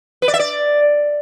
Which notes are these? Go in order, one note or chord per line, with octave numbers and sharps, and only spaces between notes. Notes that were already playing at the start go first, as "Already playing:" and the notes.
B4
D5
E5
D5